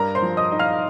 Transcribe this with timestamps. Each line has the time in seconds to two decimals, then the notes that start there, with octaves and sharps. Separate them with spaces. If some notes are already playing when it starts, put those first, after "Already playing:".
Already playing: G2 A#4 A#5
0.15 C5 C6
0.22 F3
0.37 D#5 D#6
0.52 D#4
0.59 F5 F6